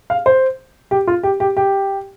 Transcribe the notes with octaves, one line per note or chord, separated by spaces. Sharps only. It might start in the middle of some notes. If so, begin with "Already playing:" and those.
F5
C5
G4
F4
G4
G4
G4